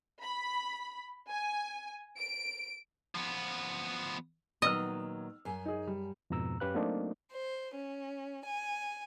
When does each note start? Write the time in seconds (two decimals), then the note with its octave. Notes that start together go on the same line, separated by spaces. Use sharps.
0.22 B5
1.29 G#5
2.18 D7
3.15 F3 B3
4.62 A#2 D#3 F#3 B3 D#5 E6 F6
5.45 F#2 G#5
5.65 D#4 G#4
5.87 G3
6.30 F2 G#2 B2 A#5 E6
6.60 F#2 C#4 G4 B4 F5 F#6
6.75 F#3 A3 A#3 C4 D4 D#4
7.33 C5
7.75 C#4
8.44 G#5